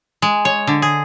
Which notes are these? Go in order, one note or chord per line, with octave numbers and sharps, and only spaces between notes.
G#3
C#5
D3
G#4